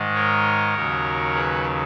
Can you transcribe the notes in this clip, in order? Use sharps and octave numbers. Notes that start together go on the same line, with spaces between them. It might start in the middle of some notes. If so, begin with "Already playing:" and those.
Already playing: G#2 D#3 G#3
A#4 C#5
D#2 C#3 F#3
G#4 B4